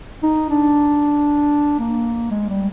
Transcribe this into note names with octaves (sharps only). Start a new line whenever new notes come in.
D#4
D4
A#3
G#3
G3